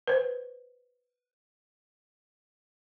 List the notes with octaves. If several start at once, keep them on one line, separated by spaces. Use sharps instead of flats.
B4 C5